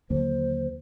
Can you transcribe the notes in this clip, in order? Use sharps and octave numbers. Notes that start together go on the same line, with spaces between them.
D#2 D3 F#3 A#3 C5